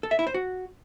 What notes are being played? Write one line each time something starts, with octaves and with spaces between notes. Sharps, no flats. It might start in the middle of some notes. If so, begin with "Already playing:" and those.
A4
E5
E4
C5
F#4